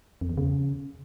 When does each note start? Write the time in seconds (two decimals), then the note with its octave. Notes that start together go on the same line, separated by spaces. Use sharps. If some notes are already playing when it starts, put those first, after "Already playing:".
0.21 F2
0.29 E2
0.38 C#3